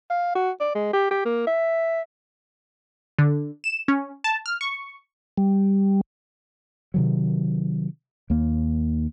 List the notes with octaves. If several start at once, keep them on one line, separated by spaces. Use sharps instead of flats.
F5
F#4
D5
G#3
G4
G4
A#3
E5
D3
E7
C#4
A5
F6
C#6
G3
C3 D#3 F#3
D#2 A#3